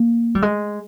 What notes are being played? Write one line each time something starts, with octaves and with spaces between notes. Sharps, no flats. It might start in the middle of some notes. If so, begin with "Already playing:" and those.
Already playing: A#3
G3
G#3